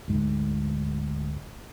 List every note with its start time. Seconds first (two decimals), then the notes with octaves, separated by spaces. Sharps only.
0.08 D2 G#2 G#3